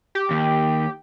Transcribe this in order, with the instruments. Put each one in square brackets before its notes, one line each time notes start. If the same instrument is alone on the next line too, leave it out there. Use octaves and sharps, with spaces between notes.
[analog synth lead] G4
[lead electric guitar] D#2